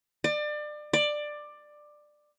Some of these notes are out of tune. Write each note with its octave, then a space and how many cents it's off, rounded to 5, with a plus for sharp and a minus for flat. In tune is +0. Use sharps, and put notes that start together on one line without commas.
D5 +30
D5 +15